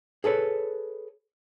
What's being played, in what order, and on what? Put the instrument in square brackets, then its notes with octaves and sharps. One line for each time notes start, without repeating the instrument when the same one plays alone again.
[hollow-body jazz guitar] G#4 A4 B4 C#5